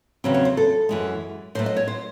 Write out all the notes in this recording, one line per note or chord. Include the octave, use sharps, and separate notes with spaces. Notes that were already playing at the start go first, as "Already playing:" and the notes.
E2 C#3 F#3 C4
C#5
C5
A4
F#2 E3 G#3
A2 F#3 A3 C5
D#5
C#5
C5